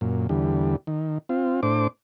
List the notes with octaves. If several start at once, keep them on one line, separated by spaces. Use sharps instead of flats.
F#2 A#2
E2 D3 G3
D#3
C4 F4
A2 D4 C5 D6